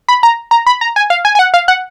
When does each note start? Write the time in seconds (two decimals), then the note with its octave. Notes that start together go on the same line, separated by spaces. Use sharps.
0.09 B5
0.23 A#5
0.51 A#5
0.67 B5
0.81 A#5
0.96 G#5
1.10 F5
1.25 G#5
1.35 G#5
1.39 F#5
1.54 F5
1.68 F#5